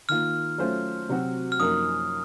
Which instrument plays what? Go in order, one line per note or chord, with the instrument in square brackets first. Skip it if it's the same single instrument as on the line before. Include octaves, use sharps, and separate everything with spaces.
[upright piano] D#3 A#3 F4 [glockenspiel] F6
[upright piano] F#3 A3 C#4 F4 C5
C3 F#3 C4 F#4
[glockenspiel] F6
[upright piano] F#2 F3 A#3 D#4 A#4 [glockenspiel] D#6